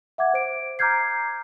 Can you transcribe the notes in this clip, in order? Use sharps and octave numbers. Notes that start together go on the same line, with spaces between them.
E5 F#5 D6 G#6
C5 D7
A#5 D6 F6 G6 G#6 C7